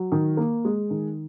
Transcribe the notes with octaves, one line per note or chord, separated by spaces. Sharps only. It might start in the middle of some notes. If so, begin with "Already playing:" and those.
Already playing: F#3
D#3
A#3
G#3
D#3